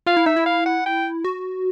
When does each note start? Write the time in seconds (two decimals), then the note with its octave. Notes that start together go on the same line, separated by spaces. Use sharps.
0.06 F4 F5
0.17 E4
0.26 D#4 E5
0.36 E4
0.46 F5
0.66 F#5
0.86 G5
1.25 F#4